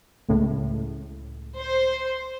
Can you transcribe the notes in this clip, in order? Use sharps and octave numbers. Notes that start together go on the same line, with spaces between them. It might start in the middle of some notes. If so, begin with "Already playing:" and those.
C#2 A2
C5